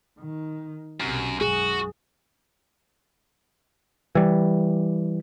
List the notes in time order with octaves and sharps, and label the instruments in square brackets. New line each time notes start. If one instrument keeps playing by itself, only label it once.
[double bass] D#3
[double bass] B1 C3 [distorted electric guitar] F#2
[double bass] F#2 [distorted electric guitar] F#4 [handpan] G#4
[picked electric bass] E3 G3